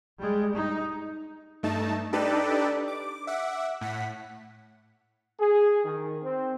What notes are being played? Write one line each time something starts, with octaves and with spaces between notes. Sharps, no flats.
G3 G#3
D#4
G2 A3 D#4 A5
D4 D#4 G4 A4 B4 D5
D6
E5 F#5 D6
A2 F#5 B6
G#4
D#3
C4